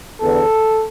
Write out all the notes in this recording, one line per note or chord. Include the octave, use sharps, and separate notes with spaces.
E2 D3 B3 A4